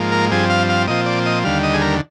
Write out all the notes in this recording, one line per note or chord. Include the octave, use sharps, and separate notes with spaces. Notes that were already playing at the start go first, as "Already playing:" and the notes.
Already playing: G#2 F3 A#3
A#4
G2 F3 C4 G#4
F5
F5
A#2 F3 C4 D#5
D5
D#5
D#2 D3 G3 F5
D#5
G#4
A#4